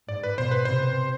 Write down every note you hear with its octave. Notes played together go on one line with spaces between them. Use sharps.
G#2 D5
B4
B2 C5
B4
C3 C5